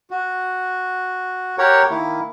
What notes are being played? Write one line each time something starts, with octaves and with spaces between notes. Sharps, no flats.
F#4
G4 A#4 C#5 F#5
D#3 A#3 E4